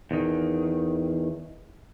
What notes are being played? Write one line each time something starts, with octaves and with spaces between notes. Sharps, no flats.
E2 D#3